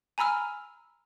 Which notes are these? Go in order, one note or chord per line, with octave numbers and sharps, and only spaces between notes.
G#5 A#5 B5 E6 F6